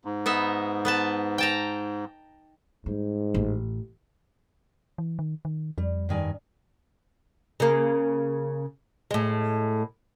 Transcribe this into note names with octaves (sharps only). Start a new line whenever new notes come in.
G#2
B3 D#4 E5
B3 B4 A5
G5 A5 A#5
G#2 G3
A1
E3
D#3
D#3
F2 G3
G2 D#3 G#5
C#3 A#3
A2 G#3